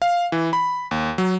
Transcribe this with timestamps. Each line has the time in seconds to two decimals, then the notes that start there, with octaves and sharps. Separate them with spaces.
0.02 F5
0.32 E3
0.53 B5
0.91 D#2
1.18 F#3